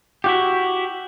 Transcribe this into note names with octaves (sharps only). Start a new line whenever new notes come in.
E4 F#4 G4